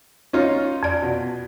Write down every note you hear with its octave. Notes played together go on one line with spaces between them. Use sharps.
C#4 D#4 F4
F2 D5
B2